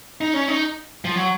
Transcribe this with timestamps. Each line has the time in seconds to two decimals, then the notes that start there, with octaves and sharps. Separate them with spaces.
0.21 D#4
0.34 C#4
0.48 D#4
1.05 F3
1.16 F#3